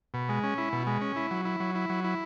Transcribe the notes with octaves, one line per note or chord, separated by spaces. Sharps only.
B2
G#3
C#4
E4
B2
G#3
C#4
E4
F#3
E4
F#3
E4
F#3
E4